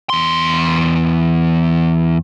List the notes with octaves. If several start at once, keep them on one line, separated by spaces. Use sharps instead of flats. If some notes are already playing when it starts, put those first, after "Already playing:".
E2 C6